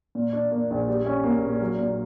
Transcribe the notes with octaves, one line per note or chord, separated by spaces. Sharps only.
A#2
D4
A#3
A#1
G3
C#4
A#3
A#2
F#3
A#2